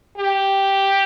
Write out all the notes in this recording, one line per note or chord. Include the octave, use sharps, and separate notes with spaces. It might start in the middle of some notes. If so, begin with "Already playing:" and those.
G4